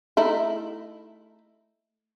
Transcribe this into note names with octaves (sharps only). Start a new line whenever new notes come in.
A3 D#4 E4